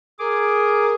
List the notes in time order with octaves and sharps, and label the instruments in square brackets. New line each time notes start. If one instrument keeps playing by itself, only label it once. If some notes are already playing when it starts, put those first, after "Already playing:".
[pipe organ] G#4 D6 [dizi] A#4